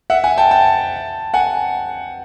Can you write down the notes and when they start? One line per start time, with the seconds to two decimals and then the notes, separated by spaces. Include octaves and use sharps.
0.10 E5 F#5
0.24 F#5 G#5
0.38 G5 A5
0.51 G5 A5
1.34 F#5 G#5